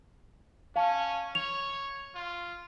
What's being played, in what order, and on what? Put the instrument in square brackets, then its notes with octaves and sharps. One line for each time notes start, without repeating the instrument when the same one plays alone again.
[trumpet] C#4 [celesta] F5 A5
[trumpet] C#5 [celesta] F7
[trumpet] F4